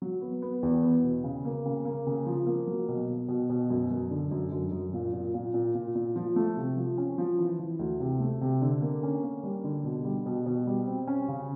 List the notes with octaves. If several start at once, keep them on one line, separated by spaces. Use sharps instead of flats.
F#3
B3
B3
E2
B3
B2
C#3
A#3
C#3
A#3
C#3
F3
A#3
F#3
B2
B2
B2
B2
F#2
F#2
D3
F#2
F#2
F#2
A#2
A#2
A#2
A#2
A#2
A#2
F3
A3
C3
F3
C#4
F3
E3
E3
D2
C3
A3
C3
D3
A#3
C#4
A#3
G3
D3
B2
G3
B2
B2
G3
C4
C#4
C#3